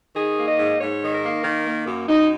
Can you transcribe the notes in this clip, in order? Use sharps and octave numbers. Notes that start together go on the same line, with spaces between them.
D#3 G#4
A#3
D#5
G#2
G#2 C#5
D#3
A#4
A#3
D#3 A#4
A#3
F#2
F#2 D#4